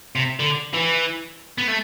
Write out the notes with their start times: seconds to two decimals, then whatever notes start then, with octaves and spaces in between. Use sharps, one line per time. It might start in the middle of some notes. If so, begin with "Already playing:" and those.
0.15 C3
0.40 D3
0.74 E3
1.58 B3
1.68 A3